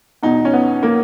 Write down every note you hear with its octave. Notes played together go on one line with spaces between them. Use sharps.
E2 B2 D#4
C#4
B3
A#3